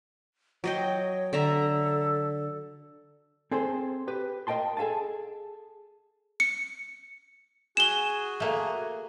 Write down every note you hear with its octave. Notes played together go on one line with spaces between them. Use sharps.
F#3 C#5 D#5 G5
D3 A4 E5 A#5
C4 G#4 A4 C5 C6
G4 B4
A#4 D#5 G5 A5 C6
G#4 A4 F5 G#5 A5
C#7
F#4 G#4 G#5 E7 G7
A3 A#3